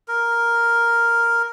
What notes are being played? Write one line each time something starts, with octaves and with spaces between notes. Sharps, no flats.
A#4